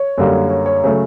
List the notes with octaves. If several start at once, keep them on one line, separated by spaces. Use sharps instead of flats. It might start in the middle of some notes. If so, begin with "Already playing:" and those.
Already playing: C#5
F#2 D3 G3 A#3
C#5
C#5
C#3 F#3 A3